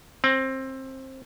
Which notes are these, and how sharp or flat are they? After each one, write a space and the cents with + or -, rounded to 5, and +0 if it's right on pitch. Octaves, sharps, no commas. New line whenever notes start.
C4 +20